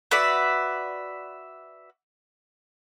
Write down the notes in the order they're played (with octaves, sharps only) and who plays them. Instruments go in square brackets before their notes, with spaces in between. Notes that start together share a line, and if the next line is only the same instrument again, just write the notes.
[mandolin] F#4 B4 D5 E5